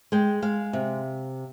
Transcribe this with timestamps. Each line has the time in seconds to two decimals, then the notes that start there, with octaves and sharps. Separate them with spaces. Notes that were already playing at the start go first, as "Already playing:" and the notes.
0.12 G#3 G5
0.42 G#3 F5
0.73 C3